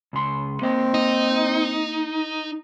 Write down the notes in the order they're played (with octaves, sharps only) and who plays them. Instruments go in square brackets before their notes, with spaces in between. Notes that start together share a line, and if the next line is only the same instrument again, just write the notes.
[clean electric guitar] C#2 C6
[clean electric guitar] A#3 D#5 [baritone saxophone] C4
[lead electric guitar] D#4